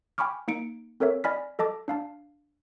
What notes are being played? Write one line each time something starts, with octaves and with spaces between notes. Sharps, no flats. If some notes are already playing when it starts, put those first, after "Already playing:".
G5 G#5 B5 C#6 D6 F6
A#3 D#4 C#7 D7
C4 A4 A#4 C#5 E5
D5 D#5 G#5 B5 F6 B6
A4 D#5 A5 D6
D4 F5 A5